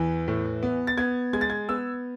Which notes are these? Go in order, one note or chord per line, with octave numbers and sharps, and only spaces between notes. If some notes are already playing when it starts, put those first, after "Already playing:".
Already playing: E2 E3
A2
B3
A6
B3 G#6
G#3 G#6
A6
G#6
B3 E6